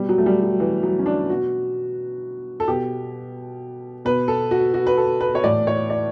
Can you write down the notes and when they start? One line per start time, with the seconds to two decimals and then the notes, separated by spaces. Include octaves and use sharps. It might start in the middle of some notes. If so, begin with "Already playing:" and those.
Already playing: B2 G3
0.09 F#3
0.18 A3
0.26 G3
0.43 F#3
0.60 E3
0.83 F#3
0.99 C#4
1.06 D4
1.29 B2 F#4
2.60 A4
2.68 B2 G4
4.05 B2 B4
4.28 A4
4.51 F#4
4.74 F#4
4.87 B4
4.97 A4
5.21 B4
5.35 C#5
5.43 A2 E3 D5
5.67 C#5
5.90 D5